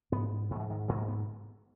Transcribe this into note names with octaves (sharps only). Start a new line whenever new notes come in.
G#2 B3
G#2
F#3
E3
D#3
G#2 F#3
A#3
B3